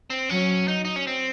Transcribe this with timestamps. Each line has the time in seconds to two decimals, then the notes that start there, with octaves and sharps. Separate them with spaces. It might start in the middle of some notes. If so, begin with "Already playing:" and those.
0.10 C4
0.29 F#3 C#4
0.68 D#4
0.85 D#4
0.96 C#4
1.07 C4